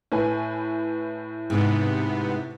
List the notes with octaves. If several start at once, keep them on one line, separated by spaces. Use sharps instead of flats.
A2 B4 G#5
G#2 C3 B3